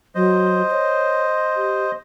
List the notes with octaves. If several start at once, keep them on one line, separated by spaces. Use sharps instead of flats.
F#3 C5 D#5
C#5
G4